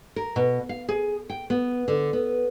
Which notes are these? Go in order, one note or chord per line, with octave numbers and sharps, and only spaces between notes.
A#4
B2
F5
G#4
G5
B3
D3
B3